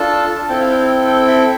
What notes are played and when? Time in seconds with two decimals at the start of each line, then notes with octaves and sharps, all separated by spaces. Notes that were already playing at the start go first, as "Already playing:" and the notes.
Already playing: D4 F4 A4 A5
0.49 C4 E4 A4 G5
0.60 F5
0.70 G5
1.07 G5
1.28 E5